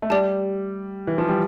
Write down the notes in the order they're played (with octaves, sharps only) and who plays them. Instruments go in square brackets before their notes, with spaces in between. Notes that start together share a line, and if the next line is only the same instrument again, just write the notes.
[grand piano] A3
[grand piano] G3 [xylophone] G4 D5 A5
[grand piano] E3
F3
G3